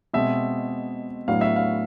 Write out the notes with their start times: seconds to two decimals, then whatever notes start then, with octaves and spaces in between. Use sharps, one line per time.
0.14 B2 G#3 C4 E5
1.28 A2 F#3 B3 D4 F5
1.41 E5
1.56 F5